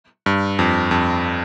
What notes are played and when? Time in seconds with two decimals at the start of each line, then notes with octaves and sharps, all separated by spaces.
0.26 G2
0.59 F2
0.91 F2